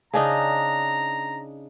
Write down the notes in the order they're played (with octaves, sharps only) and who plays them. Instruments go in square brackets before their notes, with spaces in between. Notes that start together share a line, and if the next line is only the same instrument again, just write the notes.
[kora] C#3 D4 D#4 [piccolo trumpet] A#5